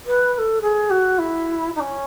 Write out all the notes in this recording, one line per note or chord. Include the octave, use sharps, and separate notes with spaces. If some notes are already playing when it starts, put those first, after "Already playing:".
B4
B4
A4
G#4
F#4
E4
D#4
C#4